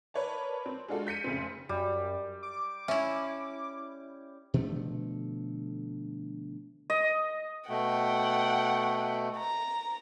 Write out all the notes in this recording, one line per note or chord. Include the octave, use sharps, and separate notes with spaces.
A#4 B4 C#5 D5 A5
C4
G#3 D4 F4 F#4 A4
G6 B6 C#7 D#7
F1 C#3 C4
F#2 G3
D6
C#4 E4 E5
B2 D3 F3 A3
D#5
B2 A3 F#5 G5
A#5